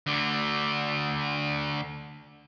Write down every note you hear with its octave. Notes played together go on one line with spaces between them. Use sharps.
D2 D3